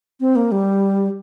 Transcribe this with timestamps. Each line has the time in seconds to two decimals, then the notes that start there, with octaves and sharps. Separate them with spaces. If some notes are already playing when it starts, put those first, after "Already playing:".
0.20 C4
0.36 A#3
0.52 G3